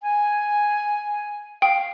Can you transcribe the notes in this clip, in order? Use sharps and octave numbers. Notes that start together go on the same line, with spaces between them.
G#5
F5 G5